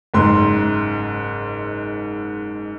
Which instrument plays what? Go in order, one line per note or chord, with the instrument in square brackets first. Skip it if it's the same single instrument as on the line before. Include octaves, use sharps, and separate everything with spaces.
[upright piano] F#1 G#2 C6